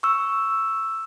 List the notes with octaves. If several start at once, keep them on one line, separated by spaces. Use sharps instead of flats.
C#6 E6